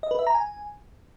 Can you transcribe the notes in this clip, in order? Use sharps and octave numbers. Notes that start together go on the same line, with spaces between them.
D#5
B4
E5
A#5
G#5